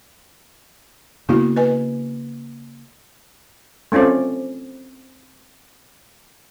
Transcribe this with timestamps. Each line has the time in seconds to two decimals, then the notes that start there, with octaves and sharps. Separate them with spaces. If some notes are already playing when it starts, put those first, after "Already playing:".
1.29 C#3 A#3 B3 E4 F#4
1.56 B4 D#5 G#5
3.92 A3 C4 C#4 F4 D5